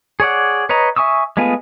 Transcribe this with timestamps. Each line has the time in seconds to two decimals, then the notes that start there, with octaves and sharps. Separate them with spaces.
0.20 G#4 C#5 D5 F#5
0.69 B4 C#5 D#5 A#5
0.96 E5 G#5 C#6 D#6 E6
1.37 G#3 A3 B3 F4 G#5